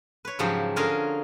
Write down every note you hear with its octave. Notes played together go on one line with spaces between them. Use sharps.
B4 C#5
G#2 C#3 F3 F#3 G4
D3 C#4 F4 G#4 A#4